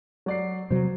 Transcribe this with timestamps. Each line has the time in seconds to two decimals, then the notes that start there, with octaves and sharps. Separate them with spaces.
0.26 F#3 D5 C7
0.70 C3 F#3 C5